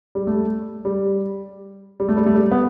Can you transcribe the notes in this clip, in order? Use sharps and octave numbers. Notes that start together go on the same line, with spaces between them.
G3
A3
G3
G3
A3
G3
A3
G3
B3